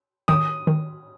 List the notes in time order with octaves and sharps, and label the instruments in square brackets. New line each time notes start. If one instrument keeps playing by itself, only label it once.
[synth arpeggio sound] D#3 [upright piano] D#6
[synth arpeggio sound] D#3